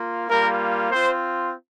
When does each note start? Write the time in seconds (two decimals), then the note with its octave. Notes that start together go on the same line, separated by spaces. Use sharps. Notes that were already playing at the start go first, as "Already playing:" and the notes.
Already playing: A#3 F4
0.29 G3 A#3 F4 A#4
0.91 C4 F4 C5